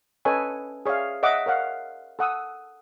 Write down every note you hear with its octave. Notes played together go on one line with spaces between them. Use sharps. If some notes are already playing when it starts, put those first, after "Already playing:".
C#4 A4 B4 C#5 D#5 G#5
G#4 C#5 D5 E5 F5
C#5 D#5 E5 F#5 D6
A#4 C#5 F5 F#5
A4 F#5 D#6 E6